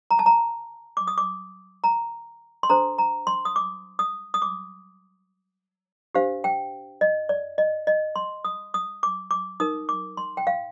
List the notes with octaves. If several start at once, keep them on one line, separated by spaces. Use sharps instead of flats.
A#5
A5
A#5
D6
D#6
D6
A#5
C6
D4 A4 C5 A#5
A#5
C6
D#6
D6
D#6
D#6
D6
D4 G4 C5 F5
G5
D#5
D5
D#5
D#5
C6
D#6
D#6
D6
D6
D#4 A#4 D#6
D6
C6
G5
F5